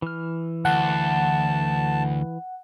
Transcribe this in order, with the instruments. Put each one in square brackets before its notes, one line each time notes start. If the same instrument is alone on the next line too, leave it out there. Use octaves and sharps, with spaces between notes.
[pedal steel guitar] E3 F6
[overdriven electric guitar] D2 [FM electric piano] F#5 [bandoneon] A5